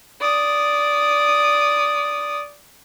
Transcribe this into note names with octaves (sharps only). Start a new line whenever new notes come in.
D5 D#6